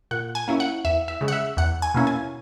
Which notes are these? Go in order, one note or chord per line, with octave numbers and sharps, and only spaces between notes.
A#2 F#5
G#5
A#3 C#4 E4
F#5
E2 E5
E5
C#3 G#3
F#5
E5
E2 F#5
G#5
B2 A#3 C#4 E4
G#5